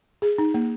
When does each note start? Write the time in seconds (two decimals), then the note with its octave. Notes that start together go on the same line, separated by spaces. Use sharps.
0.22 G#4
0.38 D#4
0.54 A#3